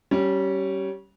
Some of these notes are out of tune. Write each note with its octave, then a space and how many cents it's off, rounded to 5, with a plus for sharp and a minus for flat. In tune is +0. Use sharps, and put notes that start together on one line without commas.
G3 -20 C#4 +0 C#5 +0